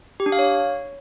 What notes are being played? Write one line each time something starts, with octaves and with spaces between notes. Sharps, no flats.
G4
D4
F5
C#5